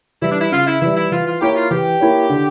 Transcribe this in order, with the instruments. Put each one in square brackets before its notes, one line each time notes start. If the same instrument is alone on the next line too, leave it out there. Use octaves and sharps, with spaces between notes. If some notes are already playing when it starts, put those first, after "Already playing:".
[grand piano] E3 G3 [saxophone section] E4
[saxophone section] D4
E4
[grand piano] C#3 [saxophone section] F4
[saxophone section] E4
[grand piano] E3 G3 [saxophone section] E4
[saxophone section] E4
[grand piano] E3 [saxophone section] F4
[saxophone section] F4
[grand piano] A#3 E4 A#4 C#5 [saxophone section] G4
[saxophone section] F4
[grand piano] E3 [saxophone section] G4
[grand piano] A#3 E4 A#4 C#5
D3